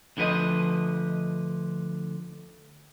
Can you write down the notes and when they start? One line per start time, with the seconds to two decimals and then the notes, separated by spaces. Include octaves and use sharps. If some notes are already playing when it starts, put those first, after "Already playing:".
0.17 D2 D3 F3 B4 D#5